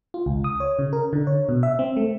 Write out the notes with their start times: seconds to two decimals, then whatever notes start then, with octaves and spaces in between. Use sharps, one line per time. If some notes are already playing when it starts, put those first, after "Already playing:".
0.14 F4
0.26 C#2
0.44 D#6
0.60 C#5
0.79 C#3
0.93 A#4
1.13 D3
1.27 C#5
1.49 B2
1.63 E5
1.79 C4
1.97 A3